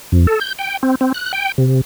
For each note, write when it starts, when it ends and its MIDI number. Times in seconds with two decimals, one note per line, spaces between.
0.12 0.26 41
0.27 0.39 69
0.40 0.53 91
0.59 0.77 79
0.83 0.95 60
1.01 1.12 60
1.14 1.32 90
1.33 1.52 79
1.58 1.81 48